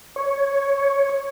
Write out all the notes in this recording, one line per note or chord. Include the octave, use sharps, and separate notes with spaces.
C#5